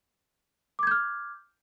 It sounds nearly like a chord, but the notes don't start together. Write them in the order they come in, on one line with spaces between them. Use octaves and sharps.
D6 G#6 G6 F6